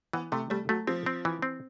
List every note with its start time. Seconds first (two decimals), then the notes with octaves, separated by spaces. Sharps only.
0.13 E3 B3
0.32 C3 A3
0.50 G3 A3
0.69 F#3 A3
0.87 F3 C4
1.06 C4
1.25 E3
1.42 C4